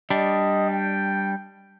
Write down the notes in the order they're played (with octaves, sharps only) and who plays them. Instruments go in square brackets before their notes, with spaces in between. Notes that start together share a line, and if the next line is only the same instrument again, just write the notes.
[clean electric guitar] G3 D4 [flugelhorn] D#5
[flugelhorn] G5